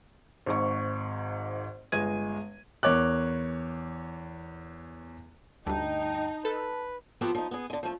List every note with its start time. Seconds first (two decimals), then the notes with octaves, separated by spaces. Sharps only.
0.46 G#1 G#2 C#6
1.92 G1 G#3 G#6 D#7
2.83 E2 A#4 C#5 D6 F#6
5.66 D2 G2 D#4 G5 A5
6.45 A4 B4
7.21 F3 B3 C4 F#4 G4 A4
7.35 F3 D#4
7.51 B3 G#4
7.70 D3 G#3
7.83 F3 A3